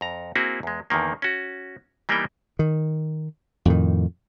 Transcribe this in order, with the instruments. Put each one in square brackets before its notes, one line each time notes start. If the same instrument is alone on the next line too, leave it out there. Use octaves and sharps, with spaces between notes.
[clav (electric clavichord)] F2 A#5
A#3 C4 E4 F#4 G#4
E2 G#3
E2 D3 D#3 A#3
C#4 F#4
E3 G3 A#3 B3 D#4 G5
[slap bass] D#3
F2 A2 D#3